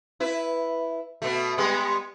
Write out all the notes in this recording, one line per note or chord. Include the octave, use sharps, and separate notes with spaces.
E4 B4
B2 A3
G3 G#3 B3